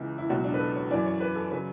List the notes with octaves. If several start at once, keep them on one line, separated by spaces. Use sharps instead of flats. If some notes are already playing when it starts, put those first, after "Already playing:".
Already playing: C#2 C#3 E3
E4
C#2 B2 F#3 F#4
D4
B4
A4
C#5
F#2 E3 D5
C#5
B4
A4
C#3 F#3 B4